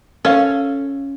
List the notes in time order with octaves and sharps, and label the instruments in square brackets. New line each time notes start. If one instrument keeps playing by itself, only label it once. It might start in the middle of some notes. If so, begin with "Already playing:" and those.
[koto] C#4 [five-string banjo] A4 F5